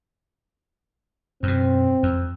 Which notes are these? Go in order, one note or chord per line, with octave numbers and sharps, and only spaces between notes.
F#2 B2 C4
F2